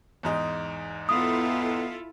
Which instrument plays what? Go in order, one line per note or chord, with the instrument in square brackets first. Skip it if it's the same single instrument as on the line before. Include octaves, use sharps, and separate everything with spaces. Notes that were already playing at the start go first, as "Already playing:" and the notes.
[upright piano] E2 G#2 D#4
[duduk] B3 [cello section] E4 F4 A4 [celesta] D#6